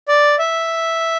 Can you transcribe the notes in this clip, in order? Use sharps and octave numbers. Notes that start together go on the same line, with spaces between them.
D5
E5